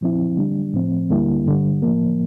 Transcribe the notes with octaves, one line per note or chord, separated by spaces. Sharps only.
A#2 F3 C4 E4
D3 G3 D4
A2 F3 C4
D2 D3 G3 A#3 E4
G2 D3 G3
A2 F3 A#3